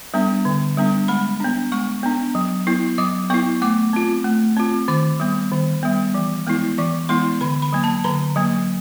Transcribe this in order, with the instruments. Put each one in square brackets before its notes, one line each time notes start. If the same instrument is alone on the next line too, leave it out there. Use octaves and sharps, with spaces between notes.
[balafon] G3 B3 D4
D3
G3 B3 D4
G#3 B5
B3 D4
G#3 C#6
B3 D4
F#3
B3 E4
F#3 D6
B3 E4 C#6
A3 D6
C4 F4
A3
C4 F4
D#3 D6
G3 B3
D#3
G3 B3
E3
G#3 B3 E4
E3 C#6
G#3 B3 E4 C6
D3 B5
B5
F#3 A#3
A5
D3 A#5
F#3 A#3